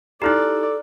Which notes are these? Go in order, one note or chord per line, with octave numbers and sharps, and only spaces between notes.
D#4 E4 G4 A4 D5 A#5 F6 F#6